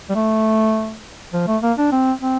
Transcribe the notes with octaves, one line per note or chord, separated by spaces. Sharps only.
G3
A3
F3
A3
A#3
D4
C4
C4